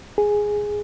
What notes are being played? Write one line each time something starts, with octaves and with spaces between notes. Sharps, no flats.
G#4